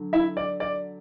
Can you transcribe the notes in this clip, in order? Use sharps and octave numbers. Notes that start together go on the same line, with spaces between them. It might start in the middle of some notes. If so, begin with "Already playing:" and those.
Already playing: D3 F#3
E4 E5
D5
D5